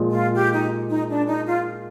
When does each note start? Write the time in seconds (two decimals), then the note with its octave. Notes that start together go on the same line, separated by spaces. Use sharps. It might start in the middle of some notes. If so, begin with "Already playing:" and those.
Already playing: A#2 F3 G#3
0.10 F4
0.35 G4
0.53 D#4
0.90 D#4
1.09 D4
1.27 D#4
1.46 F4